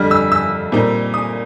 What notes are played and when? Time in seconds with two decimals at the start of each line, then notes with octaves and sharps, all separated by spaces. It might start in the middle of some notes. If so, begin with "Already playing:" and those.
Already playing: F2 D3 G3 F6
0.11 E6
0.32 E6
0.72 A#2 G3 C4 D#4
1.14 D#6